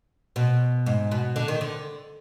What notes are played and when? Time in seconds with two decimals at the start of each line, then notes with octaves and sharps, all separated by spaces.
0.36 B2
0.86 G#2
1.11 B2
1.36 D3
1.48 D#3
1.61 D3